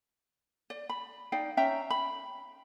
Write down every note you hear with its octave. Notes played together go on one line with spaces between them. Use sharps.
D5
B5
D#4 D5 F5 G5
C#4 E5 G5 A#5
B5